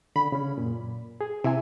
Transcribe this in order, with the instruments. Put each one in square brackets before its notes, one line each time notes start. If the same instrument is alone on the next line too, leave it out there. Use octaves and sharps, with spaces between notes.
[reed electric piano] D3 [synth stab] B5
[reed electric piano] C#3 C#4
F#2 A#2
G#4
[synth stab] C3 [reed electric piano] E4 E5 G#5